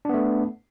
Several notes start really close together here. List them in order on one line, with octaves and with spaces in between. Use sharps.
D4 B3 A3